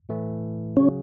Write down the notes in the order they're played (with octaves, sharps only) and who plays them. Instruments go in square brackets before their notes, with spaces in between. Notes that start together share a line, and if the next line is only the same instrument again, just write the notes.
[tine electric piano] A2 E3 A3
[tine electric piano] C#3 F#3 [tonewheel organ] C#4